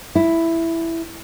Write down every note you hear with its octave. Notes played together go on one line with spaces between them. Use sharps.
E4